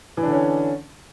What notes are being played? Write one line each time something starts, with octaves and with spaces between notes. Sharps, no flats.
D3 E3 C#4 D4